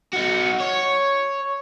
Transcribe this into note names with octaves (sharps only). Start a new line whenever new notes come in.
D#4 F#4
C#5